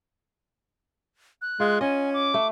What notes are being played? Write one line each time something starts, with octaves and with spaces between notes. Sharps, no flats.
F#6
G#3 F4
C#4 D#5 G#5
D6
A3